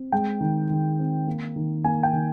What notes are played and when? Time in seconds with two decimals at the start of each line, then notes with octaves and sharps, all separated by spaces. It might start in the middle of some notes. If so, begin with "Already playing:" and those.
Already playing: C4
0.12 G#3 G5
0.41 D#3
0.70 D#3
0.99 C4
1.27 A#3
1.56 D#3
1.84 A#3 G#5
2.03 G5
2.13 D#3